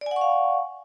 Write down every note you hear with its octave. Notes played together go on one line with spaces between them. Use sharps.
D5 F5 F#5 G#5 C#6